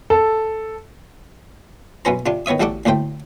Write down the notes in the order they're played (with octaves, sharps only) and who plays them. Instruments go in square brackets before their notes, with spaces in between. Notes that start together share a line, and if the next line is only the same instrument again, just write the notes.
[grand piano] A4
[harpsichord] F#2 B2 B3 C#4 C5 A#5
C3 D4 F4
D#3 B3 C#5 E5 D#6
A1 G3 F#4 A4 F#5 D6
D2 A2 A3 C5 G5